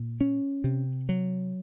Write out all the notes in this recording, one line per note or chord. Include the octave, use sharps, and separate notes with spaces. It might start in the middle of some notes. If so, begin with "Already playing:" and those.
Already playing: A#2
C#4
C3
F#3